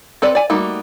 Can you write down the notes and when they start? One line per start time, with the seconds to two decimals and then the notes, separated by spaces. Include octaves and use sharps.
0.22 C4 A4 B4 D5
0.35 D5 G#5
0.50 G3 A3 A#3 D#4 F#4